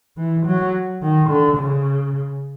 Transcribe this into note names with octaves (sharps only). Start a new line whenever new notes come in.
E3
F#3
D#3
D3
C#3